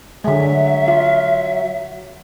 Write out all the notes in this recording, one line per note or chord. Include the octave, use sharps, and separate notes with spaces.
D3 F#3 G#3 E5
F4